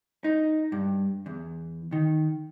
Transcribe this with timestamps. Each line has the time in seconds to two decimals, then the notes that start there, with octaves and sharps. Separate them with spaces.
0.24 D#4
0.72 G2
1.26 E2
1.92 D#3